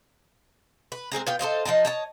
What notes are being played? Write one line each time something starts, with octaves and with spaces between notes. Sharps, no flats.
B4
G#3 C4 G#4 A#4
B3 F4 G5
A4 C5 D#5 F5
F3 D#4 D#5 A5
C#5 D#5 A5